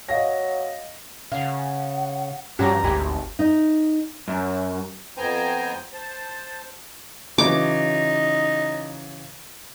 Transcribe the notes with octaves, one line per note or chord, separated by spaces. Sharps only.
F#3 D#5 F5 A#6
C#3 F5 F#5
G2 F3 C#4 F#4 G4 A#5
G#1 D2 G4 G#5 B5
D#4
F#2
F2 B3 C5 G5 G#5 A#5
C5 A5
C#3 E3 F#3 D#4 D6